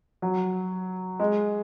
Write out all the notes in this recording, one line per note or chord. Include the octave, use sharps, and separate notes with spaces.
F#3
G#3